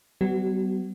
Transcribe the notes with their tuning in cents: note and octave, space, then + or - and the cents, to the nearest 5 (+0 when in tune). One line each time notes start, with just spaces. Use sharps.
G3 -40 B3 +25 F#4 +25